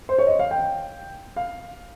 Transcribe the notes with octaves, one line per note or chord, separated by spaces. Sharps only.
C5
C#5
D#5
F5
G5
F5